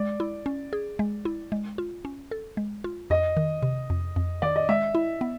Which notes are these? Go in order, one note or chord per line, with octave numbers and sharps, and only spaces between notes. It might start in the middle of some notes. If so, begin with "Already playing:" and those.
Already playing: G#3 D5
E4
C#4
G#4
G#3
E4
G#3
F4
C#4
A4
G#3
F4
F2 D#5
D#3
C3
F2
F2
D#3 D5
D#5
G#3 E5
E4
B3